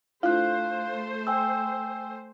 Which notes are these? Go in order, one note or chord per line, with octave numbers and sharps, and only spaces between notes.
A3 D4 E4 F4 C5 F5 F#6
G5 G#5 E6